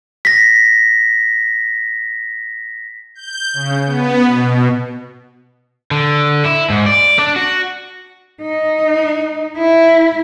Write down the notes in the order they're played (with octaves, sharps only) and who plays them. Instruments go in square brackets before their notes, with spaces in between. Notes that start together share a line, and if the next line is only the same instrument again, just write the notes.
[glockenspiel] A#6 B6
[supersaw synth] G6
C#3
B3
B2
[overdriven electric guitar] D3
E4
G#2
D5
D4
F#4
[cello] D#4
E4